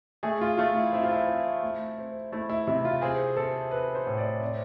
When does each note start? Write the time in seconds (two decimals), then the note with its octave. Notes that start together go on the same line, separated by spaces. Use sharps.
0.23 A3 G#4
0.41 F4
0.58 A3 F4
0.75 E4
0.92 C4 E4
1.03 F4
1.12 E4
1.28 C4
1.62 A3
1.98 C4
2.32 A3 E4
2.49 E4
2.67 C3 E4
2.85 F4
3.02 C4 G#4
3.37 C4 A4
3.71 C4 B4
3.95 C5
4.07 A2
4.18 D5
4.41 C4 D5